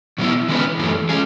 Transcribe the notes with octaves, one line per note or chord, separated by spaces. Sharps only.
B2 F#3 B3 E4
E3 G#3 C#4 G#4 B4
F#2 E3 A3
G#3 C#4 G#4